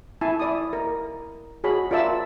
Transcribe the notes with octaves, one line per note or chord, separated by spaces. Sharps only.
E4 G#5 A5
E4 D5 D#6
A#4
F#4 G#4 C#5 B5
F4 A#4 D5 E5 A5 E6